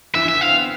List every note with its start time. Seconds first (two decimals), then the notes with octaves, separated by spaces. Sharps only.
0.15 E3 E5
0.25 E3 E5
0.35 D3
0.41 C4 F5
0.55 B3